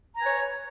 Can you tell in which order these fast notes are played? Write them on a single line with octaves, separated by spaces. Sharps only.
A#5 G#5 B4 C#5